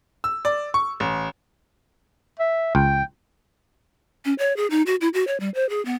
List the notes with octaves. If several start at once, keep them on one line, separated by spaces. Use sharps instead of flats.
E6
D5
C#6
A1
E5
C#2 G5
C#4
C#5
G#4
D#4
F#4
E4
F#4
C#5
G3
C5
G#4
B3